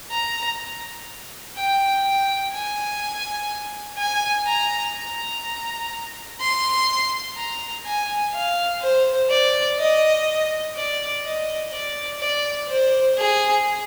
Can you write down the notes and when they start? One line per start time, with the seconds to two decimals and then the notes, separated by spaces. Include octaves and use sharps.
0.11 A#5
1.57 G5
2.05 G5
2.52 G#5
3.98 G#5
4.47 A#5
4.95 A#5
6.41 C6
7.37 A#5
7.86 G#5
8.33 F5
8.82 C5
9.30 D5
9.78 D#5
10.76 D5
11.23 D#5
11.72 D5
12.20 D5
12.68 C5
13.18 G#4